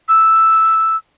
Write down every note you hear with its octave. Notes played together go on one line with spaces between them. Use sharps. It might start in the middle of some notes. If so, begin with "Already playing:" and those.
E6